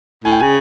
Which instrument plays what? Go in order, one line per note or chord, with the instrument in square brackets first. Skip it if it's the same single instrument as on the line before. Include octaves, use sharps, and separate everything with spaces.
[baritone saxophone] A2 [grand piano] G#5
[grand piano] G5
[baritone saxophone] C#3 [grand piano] G#5